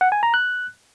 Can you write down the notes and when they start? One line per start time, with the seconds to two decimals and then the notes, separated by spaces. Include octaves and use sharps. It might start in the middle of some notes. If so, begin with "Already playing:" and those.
0.01 F#5
0.12 G#5
0.23 A#5
0.34 F#6